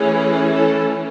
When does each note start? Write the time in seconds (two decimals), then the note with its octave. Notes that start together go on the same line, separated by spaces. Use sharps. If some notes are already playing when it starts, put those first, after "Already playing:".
Already playing: E3 A3 C#4 E4 G#4
0.55 A4